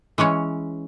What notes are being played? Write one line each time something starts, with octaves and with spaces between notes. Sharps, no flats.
E3 G#3 C#4 C#5